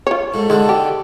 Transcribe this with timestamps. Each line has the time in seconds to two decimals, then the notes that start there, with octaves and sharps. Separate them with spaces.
0.07 F4 C#5
0.34 G#2 A4
0.50 D3 D#3 G#3
0.69 G4